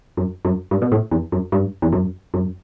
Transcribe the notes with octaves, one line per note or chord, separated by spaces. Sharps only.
F#2
F#2
G2
B2
A2
E2
F#2
G2
E2
F#2
F#2